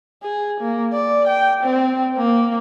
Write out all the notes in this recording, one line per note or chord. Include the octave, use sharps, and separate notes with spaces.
G#4
A#3
D5
G5
C4
A#3